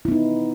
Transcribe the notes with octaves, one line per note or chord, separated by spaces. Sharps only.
B3 D#4 E4